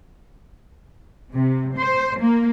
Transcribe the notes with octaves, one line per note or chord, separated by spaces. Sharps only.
C3
C5
A#3